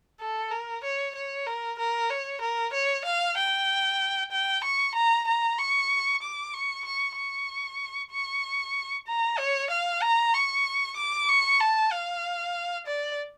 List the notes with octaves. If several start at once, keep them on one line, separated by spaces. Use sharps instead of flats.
A4
A#4
C#5
C#5
A#4
A#4
C#5
A#4
C#5
F5
G5
G5
C#6
A#5
A#5
C#6
D6
C#6
C#6
C#6
C#6
A#5
C#5
F5
A#5
C#6
D6
C#6
A5
F5
D5